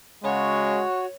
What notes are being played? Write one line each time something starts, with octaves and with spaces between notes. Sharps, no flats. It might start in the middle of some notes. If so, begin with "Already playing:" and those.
C#3 G#3 F#4 C#5